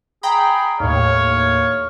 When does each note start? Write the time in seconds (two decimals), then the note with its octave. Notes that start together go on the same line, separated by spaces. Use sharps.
0.23 G#4 G5 A#5 B5
0.80 D#2 A2 C#5 F5